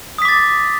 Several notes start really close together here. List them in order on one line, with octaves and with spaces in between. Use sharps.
D#6 B6 D6 A6